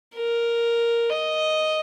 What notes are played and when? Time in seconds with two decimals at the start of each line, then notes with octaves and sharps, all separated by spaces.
0.15 A#4
1.09 D#5